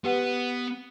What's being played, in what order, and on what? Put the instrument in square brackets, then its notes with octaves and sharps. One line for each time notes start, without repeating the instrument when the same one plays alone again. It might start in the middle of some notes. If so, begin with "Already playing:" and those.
[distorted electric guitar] B3 [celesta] G4 B4 F#5